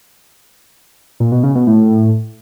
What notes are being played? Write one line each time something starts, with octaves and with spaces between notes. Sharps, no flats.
A#2
B2
C#3
B2
A2